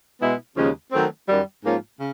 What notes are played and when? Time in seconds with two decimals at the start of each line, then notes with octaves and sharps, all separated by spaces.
0.21 B2 G#3 B3 E4
0.56 D#2 C#3 F3 G#3 C#4
0.92 D#3 F#3 A3 C4
1.28 F#2 D#3 G3
1.63 G#2 F3 A#3 C#4 F4
1.98 C#3